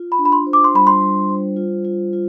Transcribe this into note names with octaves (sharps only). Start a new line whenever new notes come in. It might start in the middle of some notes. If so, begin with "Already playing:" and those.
Already playing: F4
B5
D4
B5
C6
C5
D6
C6
G3 B5
C6
G3
C5
F4
F4
F4